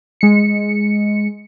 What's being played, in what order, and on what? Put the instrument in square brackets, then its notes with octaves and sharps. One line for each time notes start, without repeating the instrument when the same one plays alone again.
[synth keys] G#3 C#7